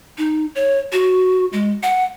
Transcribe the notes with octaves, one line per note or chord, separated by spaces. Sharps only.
D#4
C#5
F#4
G#3
F#5